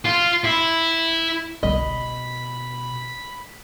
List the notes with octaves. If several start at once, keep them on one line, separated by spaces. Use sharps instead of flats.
F4
E4
G1 C2 B2 D#5 B5